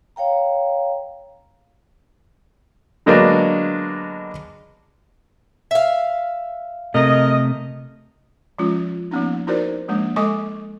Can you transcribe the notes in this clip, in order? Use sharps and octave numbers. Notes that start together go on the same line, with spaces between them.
C#5 F5 G5 A#5
D3 F#3 G#3 A#3 B3 D4
E5 F5
C3 A3 A#4 D#5
F3 G#3 C#4 F4
F3 A#3 B3 C#4 D#4
D#4 E4 F#4 A#4 C5 D5
F3 G#3 A#3 D4
G#3 A4 D#5 G#5 C#6 D6